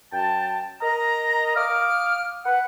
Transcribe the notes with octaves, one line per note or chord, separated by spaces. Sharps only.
F#2 G5 A5
A#4 D#5 A#5
F5 D6 D#6 F6
B4 F#5